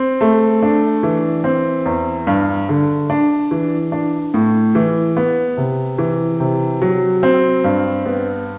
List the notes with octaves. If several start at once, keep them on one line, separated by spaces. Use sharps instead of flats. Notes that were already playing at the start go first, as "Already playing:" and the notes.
Already playing: C4
A3
D4
E3
C4
E2
G2
D3
D4
E3
D4
A2
E3
B3
C3
E3
C3
F#3
C4
G2
B3